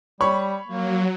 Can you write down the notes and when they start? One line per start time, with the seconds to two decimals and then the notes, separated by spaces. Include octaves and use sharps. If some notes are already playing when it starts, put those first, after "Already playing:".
0.21 G3 C#5 B5 C#6
0.68 F#3 A#3